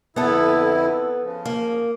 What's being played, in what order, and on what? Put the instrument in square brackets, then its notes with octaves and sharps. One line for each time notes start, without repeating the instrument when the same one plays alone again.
[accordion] F2 D3 E4 [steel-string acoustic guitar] B3 A4
[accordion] C#3 F3
[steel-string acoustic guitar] A#3